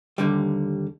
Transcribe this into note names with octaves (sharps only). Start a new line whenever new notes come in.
D#2 D3 G3